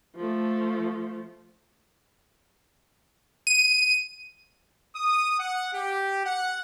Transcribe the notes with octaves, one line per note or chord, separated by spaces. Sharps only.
F3 A3
D#7
D#6
F#5
G4
F#5